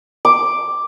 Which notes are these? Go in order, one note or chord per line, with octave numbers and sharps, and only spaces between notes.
D6